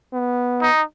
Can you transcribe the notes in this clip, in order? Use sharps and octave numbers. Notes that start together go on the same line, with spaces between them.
B3
D#4